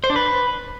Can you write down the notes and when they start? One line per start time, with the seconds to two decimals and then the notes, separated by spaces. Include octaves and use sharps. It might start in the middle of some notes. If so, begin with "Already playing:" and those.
0.04 C5
0.10 D4
0.16 B4